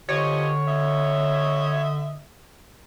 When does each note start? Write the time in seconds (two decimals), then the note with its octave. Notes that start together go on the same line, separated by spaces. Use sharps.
0.09 D3 F3 G4 C#5 D#5
0.67 D#5 E5